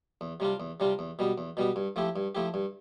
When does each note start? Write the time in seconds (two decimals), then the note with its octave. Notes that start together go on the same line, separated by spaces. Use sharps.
0.21 E2
0.40 C3 G3 D4 F4
0.60 E2
0.80 C3 G3 D4 F4
0.99 E2
1.19 B2 G3 B3
1.38 E2
1.57 B2 G3 B3
1.76 G2
1.96 F3 A3 E4 G4
2.16 G2
2.35 F3 A3 E4 G4
2.54 G2